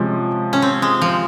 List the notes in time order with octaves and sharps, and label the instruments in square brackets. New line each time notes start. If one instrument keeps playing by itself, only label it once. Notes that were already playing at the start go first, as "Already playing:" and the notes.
Already playing: [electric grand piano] C3 F3 G#3 [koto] C#4
[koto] C#4
C4
G#3
F3